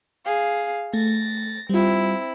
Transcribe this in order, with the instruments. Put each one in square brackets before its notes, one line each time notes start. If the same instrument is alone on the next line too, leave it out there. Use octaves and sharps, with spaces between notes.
[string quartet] G#4 F5
[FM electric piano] A3 [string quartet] A6 A#6
[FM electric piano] G3 F4 [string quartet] C4 E4